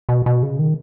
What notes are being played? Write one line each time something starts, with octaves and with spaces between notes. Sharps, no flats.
B2
B2
C#3
D#3